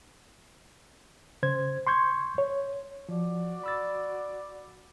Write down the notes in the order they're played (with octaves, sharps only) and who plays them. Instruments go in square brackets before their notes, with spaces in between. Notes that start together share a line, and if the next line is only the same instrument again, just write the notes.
[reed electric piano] C#3 C5 G#6
C6 C#6 G6 G#6
C#5
[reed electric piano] F3 [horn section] F#4 D5
[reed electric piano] B5 E6 A6